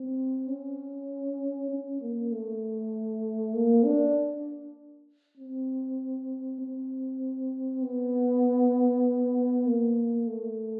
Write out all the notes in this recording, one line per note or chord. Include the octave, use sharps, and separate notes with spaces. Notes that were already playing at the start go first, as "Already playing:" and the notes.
Already playing: C4
C#4
C#4
A#3
A3
A#3
D4
C4
C4
B3
A#3
A3